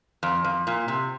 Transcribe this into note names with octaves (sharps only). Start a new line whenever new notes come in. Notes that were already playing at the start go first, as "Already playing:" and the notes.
F2
F2
A#2
C3